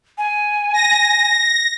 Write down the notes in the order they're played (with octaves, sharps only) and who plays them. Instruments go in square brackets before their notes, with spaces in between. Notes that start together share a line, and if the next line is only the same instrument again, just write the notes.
[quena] G#5
[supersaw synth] A#6